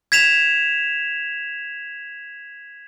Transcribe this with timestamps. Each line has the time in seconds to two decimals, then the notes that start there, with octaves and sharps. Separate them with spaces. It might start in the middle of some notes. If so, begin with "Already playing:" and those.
0.12 G#6 B6 E7 F7